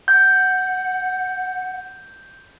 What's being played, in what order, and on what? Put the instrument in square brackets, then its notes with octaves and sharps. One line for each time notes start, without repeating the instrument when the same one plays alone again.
[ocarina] F#5 [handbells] G6